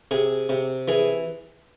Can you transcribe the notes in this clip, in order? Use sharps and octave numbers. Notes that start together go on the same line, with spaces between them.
C3 G#4
C3
E3 G#4